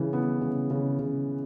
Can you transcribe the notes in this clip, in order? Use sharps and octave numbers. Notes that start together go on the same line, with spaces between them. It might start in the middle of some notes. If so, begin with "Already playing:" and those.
Already playing: C#3 E3
B3
C#3
C#3
C#3